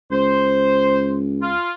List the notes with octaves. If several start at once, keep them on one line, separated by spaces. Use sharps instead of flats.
C#2 C5
F4